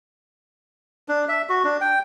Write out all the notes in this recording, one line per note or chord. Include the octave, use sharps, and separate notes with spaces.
D4
E5
F#4
D4
G5